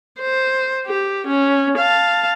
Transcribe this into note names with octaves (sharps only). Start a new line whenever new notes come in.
C5
G4
C#4
F5 A5